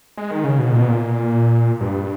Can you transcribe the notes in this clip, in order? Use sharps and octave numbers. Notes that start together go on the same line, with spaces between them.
G#3
D#3
C#3
B2
A#2
B2
A#2
G2